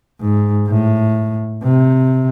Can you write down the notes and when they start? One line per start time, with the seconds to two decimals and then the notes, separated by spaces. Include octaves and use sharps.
0.21 G#2
0.69 A2
1.63 C3